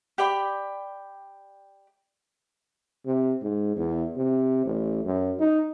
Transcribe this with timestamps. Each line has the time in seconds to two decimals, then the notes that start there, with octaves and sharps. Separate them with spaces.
0.18 G4 D5 G5 B5
3.06 C3
3.42 G#2
3.76 E2
4.16 C3
4.65 A1
5.05 F#2
5.39 D#4